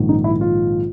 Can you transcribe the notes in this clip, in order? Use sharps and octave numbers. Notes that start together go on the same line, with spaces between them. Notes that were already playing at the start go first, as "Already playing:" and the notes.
Already playing: A#1 G#2 D#3
D#4
E4
F4